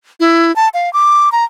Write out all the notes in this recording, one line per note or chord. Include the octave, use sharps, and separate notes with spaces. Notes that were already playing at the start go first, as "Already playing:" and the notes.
E4
A5
F5
D6
A#5